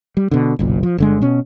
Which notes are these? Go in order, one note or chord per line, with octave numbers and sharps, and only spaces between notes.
G3
B2 D3
F#1 B1 A#2
F3
G1 D3 G#3
B2 C#4